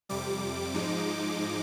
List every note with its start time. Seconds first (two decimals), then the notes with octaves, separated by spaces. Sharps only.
0.09 F2 C3 G3 D6
0.74 G#2 F3 G#3 D#4